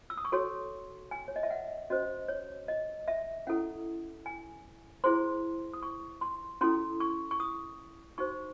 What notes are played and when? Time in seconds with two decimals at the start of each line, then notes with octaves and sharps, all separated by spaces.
0.10 E6
0.17 D#6
0.25 C#6
0.32 F#4 A4 C#5 C6
1.11 G#5
1.28 C#5
1.36 D#5
1.43 E5
1.50 F#5
1.90 C#4 F#4 C5 D#5
2.28 C#5
2.68 D#5
3.08 E5
3.47 C#4 E4 A4 F#5
4.26 G#5
5.04 E4 G#4 C5 C6
5.73 D#6
5.83 C#6
6.21 C6
6.61 C#4 E4 A4 C6
7.00 C#6
7.31 C#6
7.40 D#6
8.18 D#4 F#4 C5 C#6